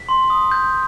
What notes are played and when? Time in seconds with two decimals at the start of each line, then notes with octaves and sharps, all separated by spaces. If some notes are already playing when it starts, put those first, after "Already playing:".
Already playing: B6
0.09 C6
0.30 D#6
0.52 G6